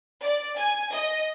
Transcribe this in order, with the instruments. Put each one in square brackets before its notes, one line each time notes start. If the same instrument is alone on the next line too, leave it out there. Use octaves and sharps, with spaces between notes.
[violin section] D5
G#5
D#5